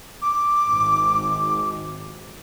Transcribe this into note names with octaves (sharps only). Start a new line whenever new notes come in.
D6
G#1